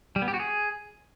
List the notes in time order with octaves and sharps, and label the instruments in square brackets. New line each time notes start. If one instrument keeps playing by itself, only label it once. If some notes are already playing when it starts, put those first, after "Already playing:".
[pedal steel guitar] G3
B3
G4
F#4
G#4